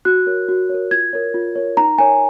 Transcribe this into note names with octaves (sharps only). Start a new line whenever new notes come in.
F#4 F#6
A#4 C#5
F#4
A#4 C#5
F4 G#6
A#4 C#5
F4
A#4 C#5
D#4 A#5
A#4 C#5 G#5